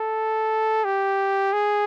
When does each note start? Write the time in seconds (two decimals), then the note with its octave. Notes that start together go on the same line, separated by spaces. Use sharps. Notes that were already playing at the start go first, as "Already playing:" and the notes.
Already playing: A4
0.84 G4
1.53 G#4